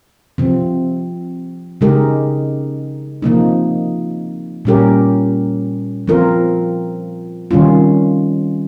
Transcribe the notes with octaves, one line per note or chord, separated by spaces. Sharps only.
C3 F3 C4
C#3 G#3 D#4 G4 A#4
C3 F3 A#3 D#4
A#2 G3 C#4 G4 A#4
F3 C4 F4 A#4
C3 D#3 G3 C#4 F4